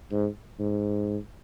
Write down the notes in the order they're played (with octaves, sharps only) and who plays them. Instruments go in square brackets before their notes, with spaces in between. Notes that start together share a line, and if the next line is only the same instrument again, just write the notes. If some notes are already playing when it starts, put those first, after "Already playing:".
[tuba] G#2
G#2